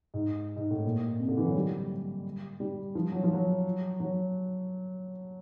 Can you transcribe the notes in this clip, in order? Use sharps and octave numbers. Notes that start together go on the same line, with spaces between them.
G#2
G#2
A2
A#2
C3
D3
E3
F#3
G3
G3
F3
F#3
F3
F#3
F#3